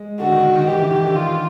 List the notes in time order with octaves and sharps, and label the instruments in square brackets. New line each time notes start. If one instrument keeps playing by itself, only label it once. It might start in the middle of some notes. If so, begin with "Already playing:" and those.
Already playing: [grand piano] G#3
[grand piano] D3 [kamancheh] F#4
[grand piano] D#3
D#3
D#3
[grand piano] E3 [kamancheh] G4
[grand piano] E3
D#3
D3
[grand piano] D#3 [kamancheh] F4